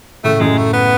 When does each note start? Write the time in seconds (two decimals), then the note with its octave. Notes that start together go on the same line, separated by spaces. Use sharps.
0.24 A2 C#3 A3
0.40 F#2 A2 G#3
0.58 A3
0.74 B3